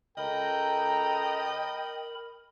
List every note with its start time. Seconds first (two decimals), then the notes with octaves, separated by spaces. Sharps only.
0.17 C#2 A4 A#4 D#5 G5 A#5 B5